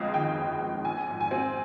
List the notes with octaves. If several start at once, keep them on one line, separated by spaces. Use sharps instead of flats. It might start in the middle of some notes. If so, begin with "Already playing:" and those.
Already playing: G1 F2 G#3 D#5 F5
D#3 G5
G1
F2
A#1 G#5
G#2
G#5
C4